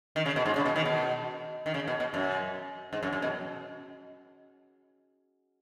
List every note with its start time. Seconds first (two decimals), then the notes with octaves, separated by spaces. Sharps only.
0.16 D#3
0.26 C#3
0.36 B2
0.46 G#2
0.56 C#3
0.66 B2
0.76 D#3
0.85 B2
1.66 D#3
1.74 C#3
1.88 B2
2.00 B2
2.14 F#2
2.93 G#2
3.03 F#2
3.13 F#2
3.22 B2